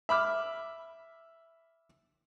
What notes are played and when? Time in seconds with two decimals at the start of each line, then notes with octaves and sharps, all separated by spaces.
0.09 E5 B5 D6 F6